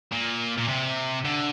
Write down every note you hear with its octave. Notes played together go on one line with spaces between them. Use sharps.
A#2
A#2
C3
D3